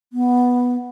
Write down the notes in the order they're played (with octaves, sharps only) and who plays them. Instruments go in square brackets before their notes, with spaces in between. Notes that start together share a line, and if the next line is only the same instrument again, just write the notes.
[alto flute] B3